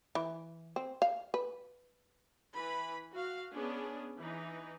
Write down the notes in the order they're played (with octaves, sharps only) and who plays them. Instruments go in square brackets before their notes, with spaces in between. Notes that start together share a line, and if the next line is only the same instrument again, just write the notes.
[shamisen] E3
C4
F5
B4
[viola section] E3 B4 B5
F#4 F5
B3 C#4 D4 G#4
E3 D#4